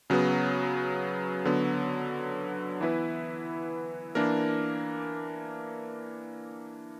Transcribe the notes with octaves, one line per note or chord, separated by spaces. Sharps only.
C#3 F#3 B3
D3 F#3 B3
E3 B3 E4 B4
E3 A#3 D4 A#4